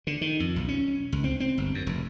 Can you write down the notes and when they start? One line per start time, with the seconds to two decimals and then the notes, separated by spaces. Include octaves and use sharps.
0.07 D3
0.21 D#3
0.40 F2
0.56 B1
0.68 C#4
1.12 C#2
1.24 C4
1.40 C4
1.58 G1
1.75 F#2
1.87 F1